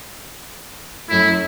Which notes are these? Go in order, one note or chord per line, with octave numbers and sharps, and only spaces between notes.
F#2 A3 E4